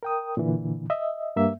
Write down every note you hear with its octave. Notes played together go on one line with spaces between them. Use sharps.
A#4 G5 D#6
A#2 D3 E3
D#5 E5
G2 A#3 E5